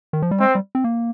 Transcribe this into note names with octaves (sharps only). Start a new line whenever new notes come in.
D#3
F3
G3
G#3 C4
G3
C4
A#3